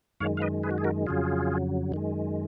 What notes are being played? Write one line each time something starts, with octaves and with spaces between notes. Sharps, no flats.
F#2 D#3 G#3 C#5 F5
F5
B4 D#5
G#4 B4
F#4
G#4
F#4 A#4
F2 C#3 F#3 F4 G#4
F#2 D#3 G#3